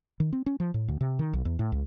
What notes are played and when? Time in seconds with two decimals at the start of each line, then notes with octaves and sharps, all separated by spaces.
0.20 D#3
0.33 C4
0.46 C#4
0.60 F3
0.74 A2
0.88 D2
1.01 C3
1.19 D#3
1.33 B1
1.45 E2
1.59 A2
1.72 C#2